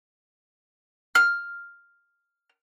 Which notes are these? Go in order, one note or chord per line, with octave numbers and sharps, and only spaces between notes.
F6